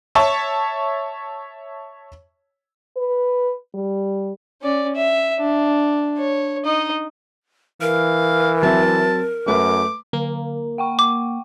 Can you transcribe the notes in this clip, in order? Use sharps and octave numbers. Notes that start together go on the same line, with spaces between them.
C#5 E5 A5 C#6
B4
G3
C#4 D5
E5
D4
C#5
D#4 D#5
E3 A#4 F5
F#3 C4 E5 A5
F#2 A3 B4 D6
D3 A#3
F#5 G5 C#6
D6